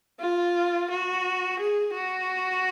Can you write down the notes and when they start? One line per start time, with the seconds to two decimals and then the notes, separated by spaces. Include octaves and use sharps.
0.20 F4
0.90 F#4
1.60 G#4
1.95 F#4